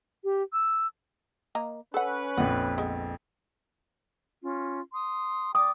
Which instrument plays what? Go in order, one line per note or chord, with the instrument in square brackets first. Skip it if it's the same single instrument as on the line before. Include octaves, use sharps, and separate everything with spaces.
[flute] G4
E6
[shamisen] A#3 D#5 A#5
[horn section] C#4 B4 [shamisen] A4 F#5
[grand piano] A#1 F2 [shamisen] F#5
[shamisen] G#3 B3
[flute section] C#4 F4
C6 D#6
[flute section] D5 G5 D6 [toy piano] D#6